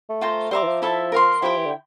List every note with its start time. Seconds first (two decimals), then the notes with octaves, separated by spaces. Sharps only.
0.09 A3
0.21 F4 C5 G5 A#5
0.51 G3 C5 E5 A#5 D6
0.63 E3
0.67 F3
0.82 E4 A4 E5 A5
1.12 A#4 F5 C6
1.42 F3 E4 G4 C5 G5
1.57 E3
1.66 D3